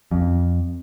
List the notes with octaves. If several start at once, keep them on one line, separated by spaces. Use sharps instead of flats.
F2